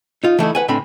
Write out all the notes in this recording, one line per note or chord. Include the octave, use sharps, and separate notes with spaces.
D#4 F4
E3 A3 D#4 E4
B4 F#5 G#5
A2 D3 C4 B5